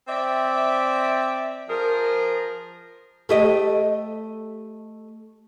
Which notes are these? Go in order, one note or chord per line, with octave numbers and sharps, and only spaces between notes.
C4 D5 E5
F3 G#4 A#4
A3 G4 D#5